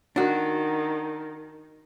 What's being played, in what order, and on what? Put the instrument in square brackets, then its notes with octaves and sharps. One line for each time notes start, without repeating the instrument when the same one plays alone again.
[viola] D#3 [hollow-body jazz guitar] D4 F#4